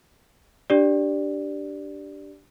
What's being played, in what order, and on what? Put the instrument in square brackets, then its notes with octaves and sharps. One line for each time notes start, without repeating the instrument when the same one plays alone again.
[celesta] D4 G4 D5